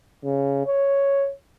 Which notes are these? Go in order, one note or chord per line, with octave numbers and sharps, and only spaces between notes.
C#3
C#5